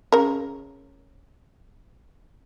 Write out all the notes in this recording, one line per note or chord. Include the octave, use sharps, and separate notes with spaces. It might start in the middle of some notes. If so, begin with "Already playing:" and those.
C#3 A#4